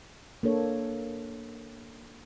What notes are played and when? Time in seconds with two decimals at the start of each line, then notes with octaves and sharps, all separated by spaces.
0.43 A#3 D4 A4 C#5